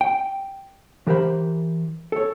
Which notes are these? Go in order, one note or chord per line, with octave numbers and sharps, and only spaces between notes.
G5
E3 G4 A#4 C5 F5 B5
A4 C#5